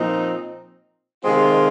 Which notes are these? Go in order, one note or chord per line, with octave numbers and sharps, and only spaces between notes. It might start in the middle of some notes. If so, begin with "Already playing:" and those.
Already playing: A#2 F3 C4 D#4
C3 D#3 G#3 C4 F4